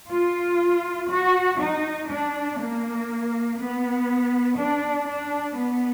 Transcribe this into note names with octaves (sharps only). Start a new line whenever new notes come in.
F4
F#4
D#4
D4
A#3
B3
D4
D4
B3